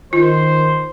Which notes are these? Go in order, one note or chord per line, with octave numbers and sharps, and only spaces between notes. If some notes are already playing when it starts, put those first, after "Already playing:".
D#3 F4 C5